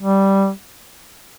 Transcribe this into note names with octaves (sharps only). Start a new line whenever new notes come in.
G3